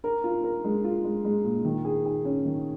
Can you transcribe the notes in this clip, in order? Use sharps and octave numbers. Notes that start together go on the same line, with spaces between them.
A#4
F4
A#4
G#3
F4
G#3
G#3
A#2
D#3
G#4
G#4
C#4
D#3